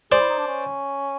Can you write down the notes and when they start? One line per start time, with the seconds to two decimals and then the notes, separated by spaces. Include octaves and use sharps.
0.11 G#4 C5 D5
0.20 E4
0.29 D#4
0.38 D4
0.47 C#4